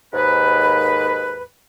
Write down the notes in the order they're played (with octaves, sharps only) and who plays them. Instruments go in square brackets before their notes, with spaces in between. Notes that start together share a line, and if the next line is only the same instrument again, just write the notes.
[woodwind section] D#2 G#2 B4